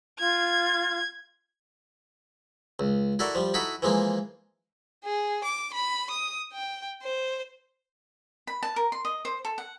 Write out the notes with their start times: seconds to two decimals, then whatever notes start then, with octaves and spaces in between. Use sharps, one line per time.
0.19 F4 G#6
2.79 C#2
3.19 E4 F#4 A4 A#4 D5
3.35 F3 G3
3.54 D#4 E4 F#4 A4 B5
3.82 E3 F3 G#3 A#3
5.05 G#4
5.44 D6
5.74 B5
6.11 D#6
6.53 G5
7.03 C5
8.47 B5
8.63 A5
8.76 A#4
8.92 C6
9.05 D#5
9.25 C5
9.45 A4
9.58 F#5